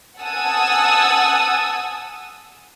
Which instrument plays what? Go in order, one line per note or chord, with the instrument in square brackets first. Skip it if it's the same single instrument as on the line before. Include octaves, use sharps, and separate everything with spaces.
[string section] F#5 G#5 A5 D#6 E6